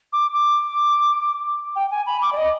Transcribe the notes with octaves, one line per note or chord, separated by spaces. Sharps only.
D6
D6
G5
G#5
B5
D6
D5
D#5